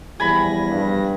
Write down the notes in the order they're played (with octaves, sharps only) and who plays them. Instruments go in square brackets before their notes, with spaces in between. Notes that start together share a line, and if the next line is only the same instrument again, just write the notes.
[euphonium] E2 [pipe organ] F3 G3 A#6 [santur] G#5 B5
[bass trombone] G2